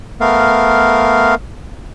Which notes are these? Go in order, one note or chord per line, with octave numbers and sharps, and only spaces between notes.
A3 B3 A#4 F5